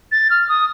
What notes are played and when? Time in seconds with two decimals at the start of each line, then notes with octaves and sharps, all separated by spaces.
0.12 A6
0.30 F6
0.49 D#6